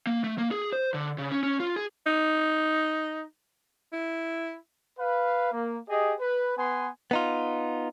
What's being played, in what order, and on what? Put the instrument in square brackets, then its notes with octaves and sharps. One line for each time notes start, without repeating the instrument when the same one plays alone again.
[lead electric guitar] A#3
A3
A#3
G#4
C5
D3
C#3
C#4
C#4
F4
G#4
[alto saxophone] D#4
E4
[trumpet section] B4 F5
A#3
G4 G#4 D#5
B4
B3 B4 G#5 C6
[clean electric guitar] B3 D#4 F4